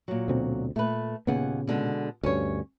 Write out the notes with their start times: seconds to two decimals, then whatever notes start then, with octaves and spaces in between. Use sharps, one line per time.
0.08 A#2 F#3
0.28 D2 B2 C4
0.76 A#2 A3 B4
1.27 D#2 A#2 C#3 B3 F#5 G#5
1.67 B2 D3 G#3
2.24 D2 G2 C#4 C#5